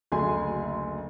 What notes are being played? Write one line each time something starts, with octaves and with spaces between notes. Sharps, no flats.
F#1 D2 A3 G#5 C6